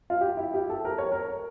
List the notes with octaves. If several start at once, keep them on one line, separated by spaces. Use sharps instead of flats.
F4
G4
E4
G4
A4
A#4
C#5
A#4